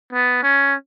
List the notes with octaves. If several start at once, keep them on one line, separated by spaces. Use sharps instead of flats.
B3
C#4